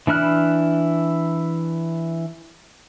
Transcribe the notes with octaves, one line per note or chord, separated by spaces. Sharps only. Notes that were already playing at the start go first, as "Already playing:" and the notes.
E3 D4 E4 F6 F#6